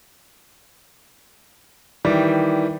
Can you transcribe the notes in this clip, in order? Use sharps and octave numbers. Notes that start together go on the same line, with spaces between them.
D#3 E3 G3